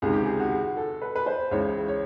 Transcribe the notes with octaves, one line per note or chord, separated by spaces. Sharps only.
C#2 C3 D#3 G#4
G4
G#4
F#4
A4
B4
B4
C5
C#2 C#3 E3 C#5
C#5